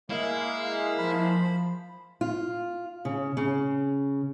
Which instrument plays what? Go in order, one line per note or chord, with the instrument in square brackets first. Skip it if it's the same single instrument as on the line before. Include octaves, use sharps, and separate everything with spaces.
[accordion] G#3 A#3 F5 [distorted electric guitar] E4
[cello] F3 [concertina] C5 B5
[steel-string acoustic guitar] F4
C#3
C#3